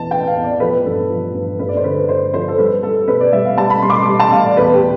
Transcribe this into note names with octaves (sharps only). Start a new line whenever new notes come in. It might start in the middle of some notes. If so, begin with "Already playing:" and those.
Already playing: E2 E3 A5
E3 G5
F5
E2
D5
F3 B4
G2 A4
F3
G2
G2 B4
D5
C5
D3 B4
G2 C5
F3 C5
A4
G3 B4
G3 A4
B2 B4
D5
G3 E5
F5
G3 A5
B5
G3 C6
D6
C6
G3
A5
G3 F5
D5
E2 B4
G4